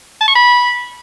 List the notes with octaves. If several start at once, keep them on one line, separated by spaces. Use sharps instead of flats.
A5
C#6
B5